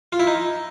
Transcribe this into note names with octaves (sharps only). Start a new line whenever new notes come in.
F4
E4
D#4